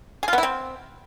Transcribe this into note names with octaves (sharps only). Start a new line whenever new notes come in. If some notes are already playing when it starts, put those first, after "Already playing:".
G#4
F4
B3
E4
C4